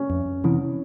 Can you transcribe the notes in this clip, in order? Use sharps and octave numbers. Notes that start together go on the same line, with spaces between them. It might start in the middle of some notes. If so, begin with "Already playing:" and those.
Already playing: C#4
F2
C3 E3